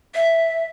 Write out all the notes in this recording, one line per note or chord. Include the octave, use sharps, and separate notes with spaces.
E5